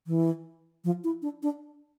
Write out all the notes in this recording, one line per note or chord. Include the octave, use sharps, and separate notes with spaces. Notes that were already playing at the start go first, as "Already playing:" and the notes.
E3
F3
E4
D4
D4